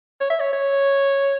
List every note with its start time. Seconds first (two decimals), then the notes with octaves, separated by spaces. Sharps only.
0.21 C#5
0.30 E5
0.40 C#5
0.53 C#5